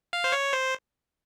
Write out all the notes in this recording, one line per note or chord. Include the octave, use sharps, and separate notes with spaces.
F5
C5
C#5
C5